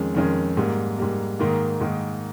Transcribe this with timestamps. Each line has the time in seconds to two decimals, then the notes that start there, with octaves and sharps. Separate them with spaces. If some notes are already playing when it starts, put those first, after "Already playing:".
Already playing: F2 D#3 G#3 C#4
0.15 F2 D#3 G#3 C#4
0.57 G#2 G3 A#3
0.98 G#2 G3 A#3
1.39 G#2 D#3 A#3
1.80 G#2 D#3 A#3